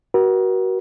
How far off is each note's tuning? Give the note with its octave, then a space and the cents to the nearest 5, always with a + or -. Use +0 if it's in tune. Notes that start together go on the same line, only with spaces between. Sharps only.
F#4 +25 A#4 +40